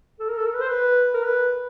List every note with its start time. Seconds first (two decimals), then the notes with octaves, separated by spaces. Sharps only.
0.20 A4
0.29 A#4
0.37 A4
0.46 A#4
0.53 B4
0.61 C5
0.68 B4
1.14 A#4
1.23 B4